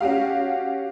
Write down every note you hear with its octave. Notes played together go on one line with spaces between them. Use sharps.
C#4 F#4 G4 F5